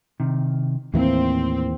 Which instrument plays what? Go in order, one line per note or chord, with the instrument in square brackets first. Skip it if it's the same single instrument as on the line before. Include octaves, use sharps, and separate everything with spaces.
[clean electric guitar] C3 D#3
[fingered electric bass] D#2 E3 A#3 [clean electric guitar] A2 [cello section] C4